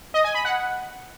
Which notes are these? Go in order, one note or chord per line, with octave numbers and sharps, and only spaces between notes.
D#5
G#5
B5
F#5